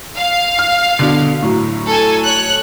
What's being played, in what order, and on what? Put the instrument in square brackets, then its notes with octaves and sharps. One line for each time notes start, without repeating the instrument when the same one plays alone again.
[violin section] F5
[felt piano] F6
B2 D3
A2 F#3
[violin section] A4 G#5
C#5 F#6